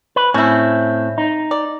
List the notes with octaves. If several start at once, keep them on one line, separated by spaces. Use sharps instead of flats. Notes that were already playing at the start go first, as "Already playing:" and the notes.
B4
A2 C4 C#4 E4
D#4
D5